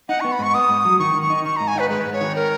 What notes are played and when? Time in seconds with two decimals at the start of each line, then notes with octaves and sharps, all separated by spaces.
0.09 D#4 F#5
0.20 B3 C#6
0.32 B5
0.39 G#2 C#6
0.54 B3 D#6
0.69 G#2
0.85 F#3
0.99 D#3 C#6
1.15 D#3
1.22 C#6
1.30 D#4
1.45 D#3 C#6
1.56 G#2 A#5
1.68 G#5
1.76 D#4 B4
1.90 G#3 B4
2.06 G#2
2.13 C#5
2.21 D#3
2.36 A#4